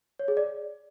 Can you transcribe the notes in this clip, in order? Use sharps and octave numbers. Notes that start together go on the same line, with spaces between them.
C#5
G#4
D5